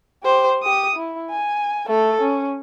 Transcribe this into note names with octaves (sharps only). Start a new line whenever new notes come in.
G4 C5
G4 D#6
E4
G#5
A3 A4
C#4